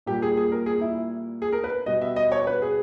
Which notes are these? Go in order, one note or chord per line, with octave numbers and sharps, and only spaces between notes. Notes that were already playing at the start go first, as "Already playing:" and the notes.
A#2 G3 A#3 G4
G#4
G#4
A#4
G#4
E4
G#4
A#4
B4
B2 G3 B3 D#5
E5
D#5
C#5
B4
G#4